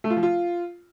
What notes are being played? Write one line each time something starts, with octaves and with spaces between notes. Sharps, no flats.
A3
F4
F3
F4